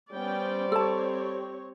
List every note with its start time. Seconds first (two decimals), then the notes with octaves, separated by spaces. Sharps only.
0.13 G3 B3 C#4 C5 D5 G5
0.72 C4 G4 A4 C#5 A5